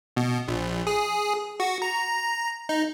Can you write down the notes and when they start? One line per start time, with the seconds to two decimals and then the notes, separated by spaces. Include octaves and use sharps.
0.17 B2
0.48 A#1
0.87 G#4
1.60 F#4
1.82 A#5
2.69 D#4